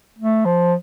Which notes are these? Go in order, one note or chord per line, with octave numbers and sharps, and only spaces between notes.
A3
F3